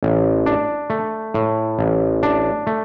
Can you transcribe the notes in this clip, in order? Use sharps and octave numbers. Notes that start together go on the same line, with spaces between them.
A1
D4
A3
A2
A1
D4
A3